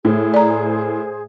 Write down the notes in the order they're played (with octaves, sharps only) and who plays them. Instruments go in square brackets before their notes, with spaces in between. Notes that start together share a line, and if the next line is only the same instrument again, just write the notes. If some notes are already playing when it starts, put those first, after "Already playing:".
[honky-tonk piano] A2 [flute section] G#4 C5
[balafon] D5 A#5